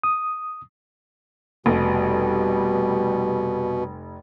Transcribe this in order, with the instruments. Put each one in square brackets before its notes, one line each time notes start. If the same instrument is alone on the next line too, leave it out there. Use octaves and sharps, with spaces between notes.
[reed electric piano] D#6
[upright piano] F1 [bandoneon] B2 [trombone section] G3